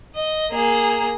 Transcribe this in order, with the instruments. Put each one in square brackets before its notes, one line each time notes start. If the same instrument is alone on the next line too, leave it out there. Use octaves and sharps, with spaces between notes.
[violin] D#5
A#3 G#4